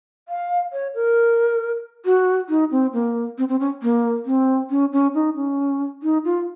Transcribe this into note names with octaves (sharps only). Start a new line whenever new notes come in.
F5
C#5
A#4
F#4
D#4
C4
A#3
C4
C4
C#4
A#3
C4
C#4
C#4
D#4
C#4
D#4
F4